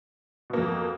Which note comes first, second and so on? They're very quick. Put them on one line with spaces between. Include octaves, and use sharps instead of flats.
B2 A#3 F2